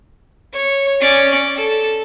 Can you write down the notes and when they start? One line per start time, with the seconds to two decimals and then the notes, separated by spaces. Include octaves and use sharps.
0.53 C#5
1.00 C#4 D5
1.55 A4